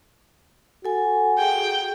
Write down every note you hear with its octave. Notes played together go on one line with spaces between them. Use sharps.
F#4 A4 G#5
G#4 G5